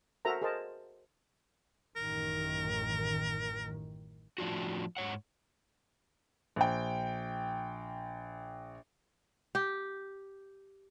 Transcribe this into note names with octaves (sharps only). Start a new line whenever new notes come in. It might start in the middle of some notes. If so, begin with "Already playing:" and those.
F#4 A4 A#4 C5 E5 A#5
G#4 A#4 C5 D#5 A5
A1 F#2 D#3 A#4
A2 F3 D4 F4 F#4
G#2 C#5 F#5
A#1 G5
G4